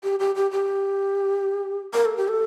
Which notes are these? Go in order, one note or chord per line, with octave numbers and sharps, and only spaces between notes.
G4
G4
G4
G4
A#4
A4
G4
A4